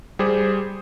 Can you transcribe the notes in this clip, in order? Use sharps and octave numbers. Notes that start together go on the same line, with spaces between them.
G3 G4 G#4 C5